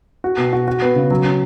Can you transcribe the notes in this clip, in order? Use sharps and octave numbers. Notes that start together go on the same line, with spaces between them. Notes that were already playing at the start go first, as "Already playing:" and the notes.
F#4
B2
F#4
F#4
B3
C#3
F#3
C#4